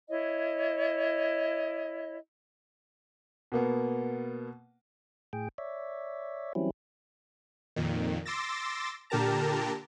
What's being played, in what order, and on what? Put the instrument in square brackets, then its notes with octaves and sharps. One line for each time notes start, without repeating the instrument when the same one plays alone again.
[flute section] E4 C#5 D#5
[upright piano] B2 A#3 B3
[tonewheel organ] A2 G#4 G5
C#5 D5 E5
E3 F#3 G3 C4 C#4 E4
[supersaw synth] F2 A#2 D#3
C6 D6 E6 A6 A#6
A#2 D3 G4 A#4 A5 A#5